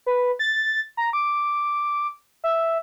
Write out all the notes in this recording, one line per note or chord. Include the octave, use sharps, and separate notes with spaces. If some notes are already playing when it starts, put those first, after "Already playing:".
B4
A6
A#5
D6
E5